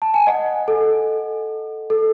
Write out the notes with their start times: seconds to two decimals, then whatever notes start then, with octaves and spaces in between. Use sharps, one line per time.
0.02 A5
0.14 G#5
0.27 D#5 F#5
0.68 A4
1.90 A4